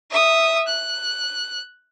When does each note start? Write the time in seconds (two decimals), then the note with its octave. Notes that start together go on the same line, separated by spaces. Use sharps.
0.11 E5 D#6
0.68 F#6